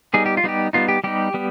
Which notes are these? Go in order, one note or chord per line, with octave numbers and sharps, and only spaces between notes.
G3 B3 D#4 G#4
G4
F4
G3 B3 D#4 G4
G3 B3 D#4 F4
G4
G3 B3 D#4 G4
G3 B3